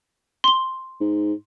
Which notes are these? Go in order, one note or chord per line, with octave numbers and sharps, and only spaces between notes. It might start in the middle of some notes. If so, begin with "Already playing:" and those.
C6 G7
G#2